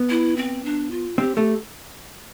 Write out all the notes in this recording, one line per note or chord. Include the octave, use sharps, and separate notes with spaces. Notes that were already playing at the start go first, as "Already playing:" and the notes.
Already playing: B3
E4
C4
D4
F4
C4 G4
A3 G4